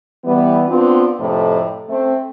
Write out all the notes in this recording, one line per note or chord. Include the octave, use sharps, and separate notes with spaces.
E3 G3 B3
B3 C4 D4 F4
F2 A2 C3 A4
A3 C4